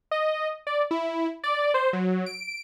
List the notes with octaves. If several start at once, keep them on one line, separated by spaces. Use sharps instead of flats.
D#5
D5
E4
D5
C5
F#3
D7